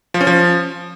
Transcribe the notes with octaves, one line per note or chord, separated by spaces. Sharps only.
F3
C#4
F3